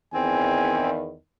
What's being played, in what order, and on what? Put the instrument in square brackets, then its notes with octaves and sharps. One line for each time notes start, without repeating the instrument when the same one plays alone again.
[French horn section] E2 D#3 [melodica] C4 [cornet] G#5